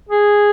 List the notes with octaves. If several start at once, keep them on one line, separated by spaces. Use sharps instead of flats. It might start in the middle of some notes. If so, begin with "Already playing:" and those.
G#4